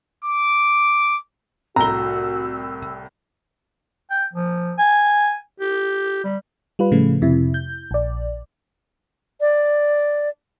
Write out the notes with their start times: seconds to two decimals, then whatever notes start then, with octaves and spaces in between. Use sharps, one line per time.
0.24 D6
1.76 C2 A2 F#4 A#5 E6 G7
4.10 G5
4.33 F3
4.78 G#5
5.60 G4
6.24 G3
6.79 G3 F4 B4
6.91 A2 C#3 F3 A3
7.22 F2 C3 E4
7.54 G6
7.91 A#1 D5
9.41 D5